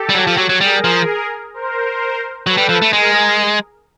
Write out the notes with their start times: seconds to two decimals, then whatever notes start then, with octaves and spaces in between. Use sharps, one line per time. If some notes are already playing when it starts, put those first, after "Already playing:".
Already playing: G4 A4
0.09 G3
0.15 F#3
0.27 F3
0.37 F#3
0.49 F#3
0.61 G3 G#4 A#4
0.84 F3
1.54 A#4 C5
2.46 F#3 A4 B4
2.57 G3
2.69 F3
2.82 A3
2.93 G#3 G#4 A#4